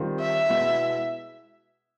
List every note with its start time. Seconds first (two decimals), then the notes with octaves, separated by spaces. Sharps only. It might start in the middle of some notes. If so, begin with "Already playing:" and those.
Already playing: D#3 G3 C4 F4
0.20 E5
0.49 B2 G#3 B3 E4